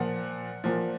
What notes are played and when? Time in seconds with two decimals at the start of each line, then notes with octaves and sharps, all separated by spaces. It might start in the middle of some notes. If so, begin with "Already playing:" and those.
Already playing: A#2 F3 F#5
0.64 A#2 F3